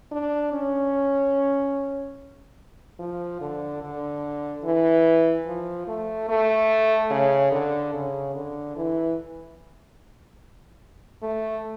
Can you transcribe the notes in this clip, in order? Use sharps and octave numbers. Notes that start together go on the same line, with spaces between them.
D4
C#4
F3
D3
D3
E3
F3
A3
A3
C#3
D3
C#3
D3
E3
A3